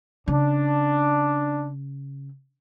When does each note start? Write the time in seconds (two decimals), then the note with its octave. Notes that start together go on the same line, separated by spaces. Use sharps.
0.28 C#3 D4